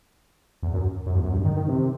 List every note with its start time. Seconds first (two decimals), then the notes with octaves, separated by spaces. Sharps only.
0.62 E2
0.74 F#2
1.06 F#2
1.15 E2
1.24 F#2
1.33 G2
1.45 D#3
1.56 D#3
1.68 C3